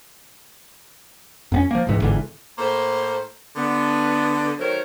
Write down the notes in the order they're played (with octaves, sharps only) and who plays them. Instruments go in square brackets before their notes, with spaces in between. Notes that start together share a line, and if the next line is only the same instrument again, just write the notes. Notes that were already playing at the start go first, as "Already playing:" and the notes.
[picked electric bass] F2 B3 C#4
F3 A#3
D#1 C2 G#2 E3
G1 G#2 D3 E3
[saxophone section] A2 A#3 A4 C5
D3 B3
D#3 F#3 A3 A#4 C5 C#5